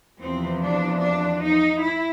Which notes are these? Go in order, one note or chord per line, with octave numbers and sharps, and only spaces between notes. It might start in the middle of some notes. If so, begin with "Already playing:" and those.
E2 C3 F3 C4
D4
D4
D#4
E4